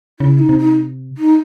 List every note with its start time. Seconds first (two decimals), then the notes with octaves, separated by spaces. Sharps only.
0.20 C#3 E4
0.39 D#4
0.49 C3
0.59 D#4
1.18 D#4